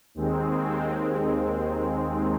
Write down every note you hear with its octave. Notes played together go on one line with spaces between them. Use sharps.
D#2 D#3 G#3 C4